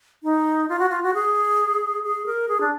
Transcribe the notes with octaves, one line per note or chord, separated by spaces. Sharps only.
D#4
F4
F#4
F4
F#4
G#4
G#4
A#4
G#4
D4